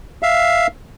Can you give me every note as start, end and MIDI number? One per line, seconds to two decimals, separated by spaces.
0.23 0.67 76
0.23 0.67 77